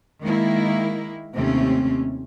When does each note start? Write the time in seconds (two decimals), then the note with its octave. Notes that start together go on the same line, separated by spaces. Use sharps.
0.22 D#3 G#3 A#3 E4
1.33 D#2 C3 A3 C4 C#4